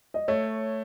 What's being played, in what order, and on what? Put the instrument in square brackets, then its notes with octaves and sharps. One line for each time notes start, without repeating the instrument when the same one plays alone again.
[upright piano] D#5
[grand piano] A3 [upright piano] C#5